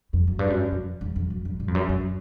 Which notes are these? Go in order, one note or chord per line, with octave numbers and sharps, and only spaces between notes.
F2
F#2
G2
F#2
F2
E2
F2
F#2
F2
G2
F2
F#2
F#2